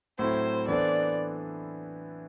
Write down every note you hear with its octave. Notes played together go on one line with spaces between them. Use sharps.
A2 F#3 A3 C4 E4 C5
E3 B3 D4 A4 C5 D5